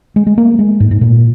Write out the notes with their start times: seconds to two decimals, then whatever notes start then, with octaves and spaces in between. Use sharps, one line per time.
0.16 G#3
0.27 G#3
0.38 A#3
0.59 G#3
0.80 G#2
0.91 G#2
1.01 A#2